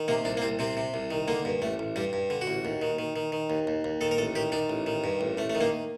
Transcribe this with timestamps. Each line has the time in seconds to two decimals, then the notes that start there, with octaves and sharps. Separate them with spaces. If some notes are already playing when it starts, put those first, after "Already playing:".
Already playing: D#3
0.08 C3 A#3
0.25 C2 D4
0.37 A#3
0.42 C2 C4
0.59 C3 C4
0.77 C3
0.94 C2
1.11 D#3
1.28 D3 A#3
1.45 G2
1.62 A1 A3
1.79 A1
1.96 G2 G3
2.13 G2
2.30 D3
2.41 F#4
2.47 A1
2.65 D#2
2.82 D#3
2.99 D#3
3.16 D#3
3.32 D#3
3.50 D#2
3.67 D#2
3.84 D#2
4.01 D#3 A4
4.11 A#4
4.18 A1 A4
4.35 D#3 G4
4.52 D#3 D4
4.70 A1
4.87 D#3
5.04 G2
5.21 A1
5.38 A1 A3
5.50 A3
5.55 D#3
5.61 A#3